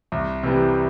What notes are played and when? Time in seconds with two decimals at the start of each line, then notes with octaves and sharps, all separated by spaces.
0.12 C2
0.43 C3 E3 G3